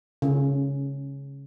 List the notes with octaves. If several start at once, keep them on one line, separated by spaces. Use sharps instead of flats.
C#3